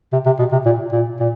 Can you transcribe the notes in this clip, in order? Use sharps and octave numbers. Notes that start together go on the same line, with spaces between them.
C3
C3
B2
C3
A#2
A#2
A#2